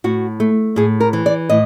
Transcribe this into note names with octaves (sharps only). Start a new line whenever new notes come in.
A2 F#4
A3
A2 G#4
A#4
E3
D5
A2 D#5